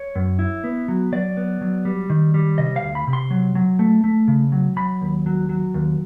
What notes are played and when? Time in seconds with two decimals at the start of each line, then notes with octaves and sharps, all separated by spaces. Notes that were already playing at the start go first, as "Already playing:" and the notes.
Already playing: C#5
0.16 F#2
0.39 E4
0.64 B3
0.88 F#3
1.12 F#3 D5
1.37 B3
1.61 F#3
1.85 G3
2.10 D#3
2.34 G3
2.58 C3 D#5
2.76 F5
2.83 D2
2.95 B5
3.07 C3
3.13 C6
3.31 F#3
3.55 F#3
3.79 A3
4.04 A3
4.28 C#3
4.52 F#3
4.76 F#3 B5
5.01 D#2
5.26 F#3
5.49 F#3
5.74 D#2